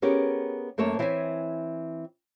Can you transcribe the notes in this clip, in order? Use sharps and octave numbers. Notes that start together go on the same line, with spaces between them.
B3 C#4 G4 G#4 A#4
F#2 A3 A#3 C#5 A5
E3 C4 C#5 E5 G#5